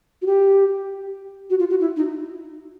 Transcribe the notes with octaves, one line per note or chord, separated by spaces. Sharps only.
F#4
G4
F#4
F4
F#4
E4
D#4